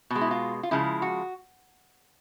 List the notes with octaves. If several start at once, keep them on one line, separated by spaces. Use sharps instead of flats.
B2 G#3
E4
F4
F4
C#3 F3 G#3 E4
F#4